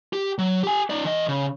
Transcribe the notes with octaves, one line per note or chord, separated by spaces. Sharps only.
G4
F#3
G4 G#5
D#4 D5
E3 D#5
C#3